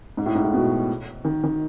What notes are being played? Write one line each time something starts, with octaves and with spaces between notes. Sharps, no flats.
G#2
A2
G#2
A2
B2
D#3
D#3